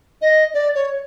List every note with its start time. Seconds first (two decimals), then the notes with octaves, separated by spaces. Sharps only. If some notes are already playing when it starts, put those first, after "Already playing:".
0.22 D#5
0.54 D5
0.75 C#5